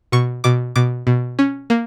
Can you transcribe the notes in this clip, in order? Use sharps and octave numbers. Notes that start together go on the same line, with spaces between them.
B2 C#6
B2 D6
B2 D6
B2
C#4
A#3